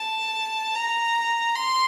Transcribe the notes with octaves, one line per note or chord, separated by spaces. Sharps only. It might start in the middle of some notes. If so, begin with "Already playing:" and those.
Already playing: A5
A#5
C6